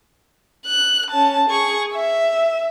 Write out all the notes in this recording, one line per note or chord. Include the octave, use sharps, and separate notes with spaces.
F#6
C#4 A5
G#4 C#6
E5